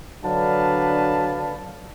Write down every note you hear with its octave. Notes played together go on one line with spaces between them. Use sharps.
D3 F#3 D4 B4 F5 A5